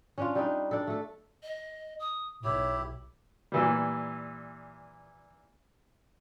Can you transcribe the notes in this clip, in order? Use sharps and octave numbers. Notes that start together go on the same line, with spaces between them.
C#4 D4 F4
G3 D4 D#4
D4 A4
A3 A4
D#5
D#6
B1 E4 G4 C#5
A#2 E3 G3